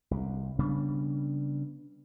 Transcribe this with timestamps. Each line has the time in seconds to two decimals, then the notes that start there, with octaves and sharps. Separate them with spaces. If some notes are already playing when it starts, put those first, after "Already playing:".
0.11 C2
0.59 C#3 G3 B3 D4